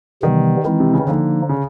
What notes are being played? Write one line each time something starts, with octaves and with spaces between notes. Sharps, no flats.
C3 D#3 E3 G3 B3
D#3 E3 G#3 C4 E4
C3
C#3
D3 F3 A#3 D#4
C#3